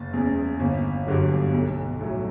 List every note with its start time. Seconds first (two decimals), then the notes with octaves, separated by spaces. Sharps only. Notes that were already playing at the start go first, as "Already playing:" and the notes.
Already playing: F#1 A6
0.14 E2 C#3
0.60 G1
1.07 G2 D3 F#3
1.53 B1
2.01 A2 F#3